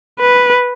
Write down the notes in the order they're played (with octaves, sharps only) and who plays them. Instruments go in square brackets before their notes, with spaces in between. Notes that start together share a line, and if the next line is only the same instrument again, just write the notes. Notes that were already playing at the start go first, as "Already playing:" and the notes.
[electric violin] B4